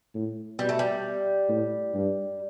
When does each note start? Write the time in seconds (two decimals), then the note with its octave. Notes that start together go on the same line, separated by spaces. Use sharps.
0.15 A2
0.59 B2 G3
0.69 A3
0.79 G3
1.49 A2
1.94 G2